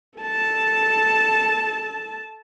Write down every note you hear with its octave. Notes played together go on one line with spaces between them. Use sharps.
A4 A5